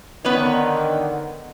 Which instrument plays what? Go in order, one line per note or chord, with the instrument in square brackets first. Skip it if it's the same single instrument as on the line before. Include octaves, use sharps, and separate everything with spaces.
[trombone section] D3 D#3 [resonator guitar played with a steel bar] B3 B4 C#5